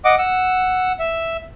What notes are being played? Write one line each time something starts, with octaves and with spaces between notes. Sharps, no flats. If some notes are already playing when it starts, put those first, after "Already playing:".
D#5 F#5 D6
F#5 E6
E5